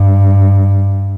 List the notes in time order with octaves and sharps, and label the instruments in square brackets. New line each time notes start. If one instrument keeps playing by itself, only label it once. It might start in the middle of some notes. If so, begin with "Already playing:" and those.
Already playing: [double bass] G2